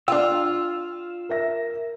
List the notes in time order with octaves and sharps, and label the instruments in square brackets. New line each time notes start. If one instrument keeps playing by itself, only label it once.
[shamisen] D4 G5 [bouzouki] F4 [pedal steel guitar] E6
[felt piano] A#4 E5 A#6